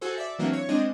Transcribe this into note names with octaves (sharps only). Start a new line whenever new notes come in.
F#4 G#4 A4 C5
D5 E5
E3 F#3 A#3 C4 D4 E5
C#5
G#3 C4 D4 D#5